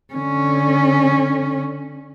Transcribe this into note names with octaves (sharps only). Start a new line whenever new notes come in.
D3 C#4